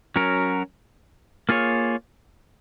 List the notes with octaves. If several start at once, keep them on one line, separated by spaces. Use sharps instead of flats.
F#3 C#4 F#4 A#4
A#3 F4 G#4 C#5